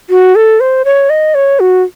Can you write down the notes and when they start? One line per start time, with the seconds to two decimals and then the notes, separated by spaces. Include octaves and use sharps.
0.10 F#4
0.35 A4
0.60 C5
0.85 C#5
1.10 D#5
1.34 C#5
1.60 F#4